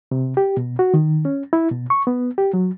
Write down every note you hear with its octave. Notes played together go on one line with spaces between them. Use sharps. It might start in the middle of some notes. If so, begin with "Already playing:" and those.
C3
G4
B2
F#4
D#3
C#4
E4
B2
C#6
B3
G4
F#3